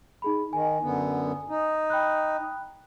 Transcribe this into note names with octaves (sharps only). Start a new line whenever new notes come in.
D#4 G#4 B5
D#3 G#5
F#2 D3 B3
D#4
G5 B5 F#6